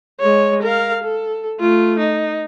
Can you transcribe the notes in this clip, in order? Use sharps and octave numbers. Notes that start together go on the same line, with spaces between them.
G#3 C#5
A#4 F5
A4
A3 F4
D#4